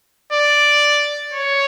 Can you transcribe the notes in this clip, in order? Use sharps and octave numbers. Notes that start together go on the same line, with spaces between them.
D5
C#5